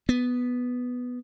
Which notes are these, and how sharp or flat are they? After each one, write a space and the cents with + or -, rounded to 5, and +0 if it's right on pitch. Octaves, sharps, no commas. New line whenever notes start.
B3 +0